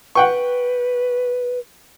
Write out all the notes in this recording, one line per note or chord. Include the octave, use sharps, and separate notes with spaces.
B4 F#5 G5 C#6